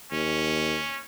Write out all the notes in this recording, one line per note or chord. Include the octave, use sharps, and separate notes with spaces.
D#2 C#4